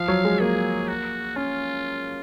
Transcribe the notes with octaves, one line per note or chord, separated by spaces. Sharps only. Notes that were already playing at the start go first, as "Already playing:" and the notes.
Already playing: F3 F5
F#3
G#3
A#3 G#4
F#4
C#4 F4